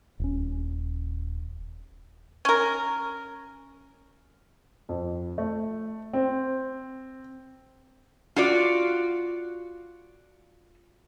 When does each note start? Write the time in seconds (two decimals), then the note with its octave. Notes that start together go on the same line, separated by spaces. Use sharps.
0.20 D#1 C#4
2.45 C#4 A#4
4.89 F2
5.38 A3
6.13 C4
8.36 F4 F#4 D5